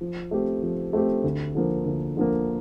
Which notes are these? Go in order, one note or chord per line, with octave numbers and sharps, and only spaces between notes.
F3
A3 C4 G4
F3
A3 C4 G4
D2
D3 F3 A#3
D2
D3 F3 A#3